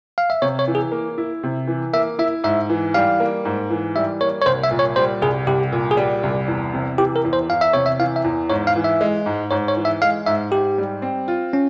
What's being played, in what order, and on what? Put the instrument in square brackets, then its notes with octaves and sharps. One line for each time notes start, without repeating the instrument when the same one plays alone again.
[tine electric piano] F5
E5
[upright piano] C3 [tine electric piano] C#5
[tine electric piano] C#5
[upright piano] E3
[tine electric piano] G#4
[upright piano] A#3
E4
C3
E3
[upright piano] A#3 [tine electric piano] E5
[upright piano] E4 [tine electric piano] E5
[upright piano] G#2 [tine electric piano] E5
[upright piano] E3
[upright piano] G3 [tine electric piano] F5
[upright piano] A#3
G#2
E3
[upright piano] G3 [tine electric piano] E5
[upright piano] A#3 [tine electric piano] C#5
[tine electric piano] C#5
[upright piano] C2 [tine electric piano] C5
[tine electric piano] E5
[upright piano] A#2
[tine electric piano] C#5
[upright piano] G3 [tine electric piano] C5
[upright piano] C2 [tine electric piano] G#4
[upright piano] C2 [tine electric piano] G4
[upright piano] A#2
[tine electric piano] G#4
[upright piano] G3 [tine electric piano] G4
[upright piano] C2
E2
C3
[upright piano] E3 [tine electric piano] G4
[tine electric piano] A#4
[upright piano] E2
[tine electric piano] C5
[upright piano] E2 [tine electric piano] F5
[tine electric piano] E5
[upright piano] C3 [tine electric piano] C#5
[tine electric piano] E5
[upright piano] E3 [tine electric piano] F5
[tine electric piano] E5
[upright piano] E2
[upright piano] G#2 [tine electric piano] C#5
[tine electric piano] F5
[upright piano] E3
[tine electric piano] E5
[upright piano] G#3
G#2
[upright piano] G#2 [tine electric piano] C#5
[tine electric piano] C#5
[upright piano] E3
[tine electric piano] E5
[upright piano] G#3 [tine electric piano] F5
[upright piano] G#2 [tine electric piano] E5
[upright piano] G#2 [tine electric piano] G4
[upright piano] G3
C4
F4
[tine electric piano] C#4